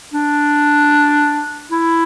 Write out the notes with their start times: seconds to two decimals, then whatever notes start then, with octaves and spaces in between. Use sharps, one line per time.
0.14 D4
1.71 E4